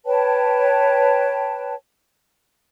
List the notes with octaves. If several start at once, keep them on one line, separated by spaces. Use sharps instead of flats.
B4 C#5 G5 A5